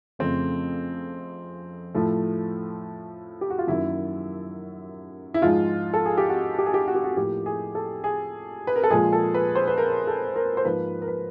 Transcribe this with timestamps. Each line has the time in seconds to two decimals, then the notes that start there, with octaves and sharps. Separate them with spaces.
0.19 F2 C#3 F3 A3 C4
1.94 A2 F3 A3
3.41 G4
3.50 F#4
3.59 F4
3.67 F#2 D#3 F#3 A#3 E4
5.34 E4
5.42 G#2 F3 G#3 F4
5.94 A4
6.06 G#4
6.18 G4
6.29 F#4
6.59 G4
6.66 G#4
6.74 G4
6.88 F#4
6.95 G4
7.04 F#4
7.17 A2 F3 A#3 G4
7.46 G#4
7.75 A4
8.04 G#4
8.67 B4
8.76 A#4
8.83 A4
8.90 A#2 F3 G#3 G#4
9.13 A4
9.34 B4
9.55 C5
9.67 B4
9.78 A#4
10.07 A4
10.36 A#4
10.57 C5
10.65 G#2 F3 A#3 B4
11.02 A#4
11.08 B4